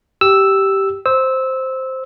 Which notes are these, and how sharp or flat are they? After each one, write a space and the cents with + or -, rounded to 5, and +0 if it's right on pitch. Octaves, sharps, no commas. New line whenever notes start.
G4 -10 E6 +0
C5 +0 E6 -15